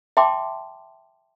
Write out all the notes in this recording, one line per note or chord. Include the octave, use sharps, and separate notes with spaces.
E5 G5 A5 C6 D6